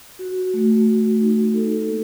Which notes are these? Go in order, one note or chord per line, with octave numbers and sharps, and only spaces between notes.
F#4
A3
A3
D#4
A4
A#3